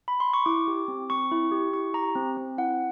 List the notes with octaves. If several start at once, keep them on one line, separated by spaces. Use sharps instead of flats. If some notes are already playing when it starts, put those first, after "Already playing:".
B5
C6
C#6
E4 D6
G4
C4
C4 C#6
E4
G4
E4 C#6
G4 A#5
C4
C4
E4 F#5